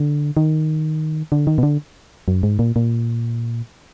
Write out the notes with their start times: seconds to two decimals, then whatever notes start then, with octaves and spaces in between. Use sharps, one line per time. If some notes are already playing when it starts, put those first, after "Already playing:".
Already playing: D3
0.37 D#3
1.32 D3
1.47 D#3
1.58 B2
1.63 D3
2.28 F#2
2.43 G#2
2.59 A#2
2.76 A#2